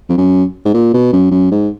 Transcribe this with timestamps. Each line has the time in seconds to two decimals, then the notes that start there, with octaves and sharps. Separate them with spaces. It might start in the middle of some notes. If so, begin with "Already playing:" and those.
0.09 F2
0.18 F#2
0.65 G#2
0.74 A#2
0.93 B2
1.13 F#2
1.31 F#2
1.51 G#2